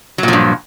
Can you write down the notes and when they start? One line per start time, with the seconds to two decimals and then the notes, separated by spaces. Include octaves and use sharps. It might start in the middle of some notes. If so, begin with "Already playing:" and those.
0.18 F#3
0.23 A#2
0.28 F3
0.33 G2